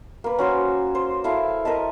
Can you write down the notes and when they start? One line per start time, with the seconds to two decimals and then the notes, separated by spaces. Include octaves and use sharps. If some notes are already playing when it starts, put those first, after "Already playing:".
0.24 A#3 B4
0.39 C#4 F#4 C5
0.95 C5
1.24 E4 A4 F5
1.65 A#4 D#5 E5 A5